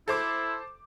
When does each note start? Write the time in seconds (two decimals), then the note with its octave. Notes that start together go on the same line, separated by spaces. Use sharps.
0.08 E4 A4 C5 D6